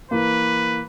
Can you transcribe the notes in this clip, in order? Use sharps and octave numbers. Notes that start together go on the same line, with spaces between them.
E3 A#3 B4